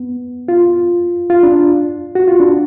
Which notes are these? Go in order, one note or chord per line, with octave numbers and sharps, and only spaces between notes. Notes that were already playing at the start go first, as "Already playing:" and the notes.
Already playing: B3
F4
F4
D4
F#4
F4
D4